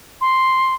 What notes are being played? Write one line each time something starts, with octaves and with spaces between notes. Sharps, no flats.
C6